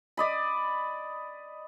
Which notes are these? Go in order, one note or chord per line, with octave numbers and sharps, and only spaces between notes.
D5 D#5 B5